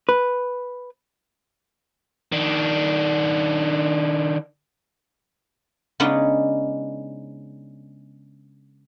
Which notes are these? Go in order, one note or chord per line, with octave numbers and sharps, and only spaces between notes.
B4
D#3 D4
C#3 G#3 B3 D4 D#4 F#5